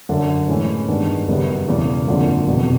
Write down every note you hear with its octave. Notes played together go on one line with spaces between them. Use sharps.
F#2 D3 F#3
A2 E3 G#3 C#4 E4
G2 D#3 G#3 B3 D4
F#1 F#2 D#3 G3 B3
E1 E2 C#3 E3
G#1 F#2 D3 F3 A#3
F1 E2 B2